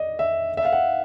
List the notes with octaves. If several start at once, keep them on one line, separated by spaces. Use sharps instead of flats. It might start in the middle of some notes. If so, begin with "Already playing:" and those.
Already playing: D5 D#5
E5
E5
F5
F#5